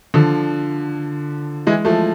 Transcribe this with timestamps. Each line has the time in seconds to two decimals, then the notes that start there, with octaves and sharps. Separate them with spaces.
0.14 D3 F3
1.67 E3 G#3
1.85 F3 A3